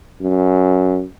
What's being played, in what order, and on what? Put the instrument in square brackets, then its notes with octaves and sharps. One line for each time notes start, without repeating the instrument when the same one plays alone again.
[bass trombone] F#2